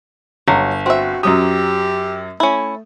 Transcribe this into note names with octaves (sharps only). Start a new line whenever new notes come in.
G1 F#3
C4 F#4 E5
F#2 F#3 G4 D#6
A3 C#4 E4